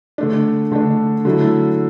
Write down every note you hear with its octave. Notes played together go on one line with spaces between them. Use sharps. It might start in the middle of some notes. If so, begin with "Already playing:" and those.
D3 A3 D4
D3 A3 D4
D3 F#3 A3 E4